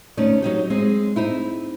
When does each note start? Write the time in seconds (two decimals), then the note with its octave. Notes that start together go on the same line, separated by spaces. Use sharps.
0.17 D2 A3 C#4 D#4 D5
0.42 F#3 D#4 G4
0.70 G#3 C4 G#4
1.16 C4 D#4 E4